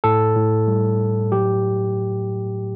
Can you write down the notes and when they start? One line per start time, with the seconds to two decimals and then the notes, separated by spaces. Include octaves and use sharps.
0.04 A2 A4
0.36 A2
0.68 G3
0.99 A2
1.32 F#3 G4